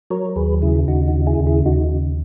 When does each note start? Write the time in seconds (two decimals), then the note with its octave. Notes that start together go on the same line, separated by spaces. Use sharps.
0.10 F#3 A#4 C#5
0.36 D#2 G#4 B4
0.62 C#3 E4 G#4
0.88 D#2 D#4 F#4
1.07 D#4 F#4
1.14 C#3
1.27 E4 G#4
1.40 D#2
1.46 E4 G#4
1.66 D#2 D#4 F#4
1.92 C#3